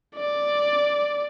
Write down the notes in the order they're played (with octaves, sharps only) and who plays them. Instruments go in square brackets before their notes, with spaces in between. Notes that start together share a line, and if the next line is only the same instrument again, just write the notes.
[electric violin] D5